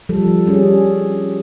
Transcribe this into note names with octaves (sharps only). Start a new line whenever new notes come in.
F3 G3 A4
G3 C#4 G#4